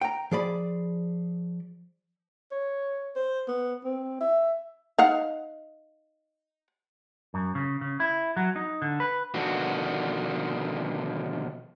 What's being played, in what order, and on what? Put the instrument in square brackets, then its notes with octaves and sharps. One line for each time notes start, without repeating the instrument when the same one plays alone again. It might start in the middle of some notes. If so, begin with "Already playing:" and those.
[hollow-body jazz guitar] G5 A#5
F3 G#4 D5 B5
[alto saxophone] C#5
C5
B3
C4
E5
[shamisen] D#4 F5 F#5
[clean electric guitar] F#2
C#3
C#3
E4
F#3
D#4
D3
B4
[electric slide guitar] B2 D3 D#3 F3 F#4